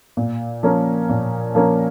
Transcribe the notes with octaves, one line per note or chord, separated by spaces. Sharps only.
A#2
F3 A#3 C#4 A#4
A#2
F3 A#3 C#4 A#4